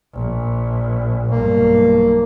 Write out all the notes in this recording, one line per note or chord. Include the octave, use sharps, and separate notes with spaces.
A#1
B1 G2 A#3